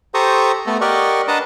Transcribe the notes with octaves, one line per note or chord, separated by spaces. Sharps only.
G4 A4 C5 A#5 C#6 D#6
A3 B3 A4
G4 A#4 D5 D#5 F#5 C#6
D4 B4 D#5 F#5 A5 A#5